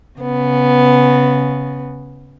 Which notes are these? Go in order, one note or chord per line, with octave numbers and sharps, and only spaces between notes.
C#3 B3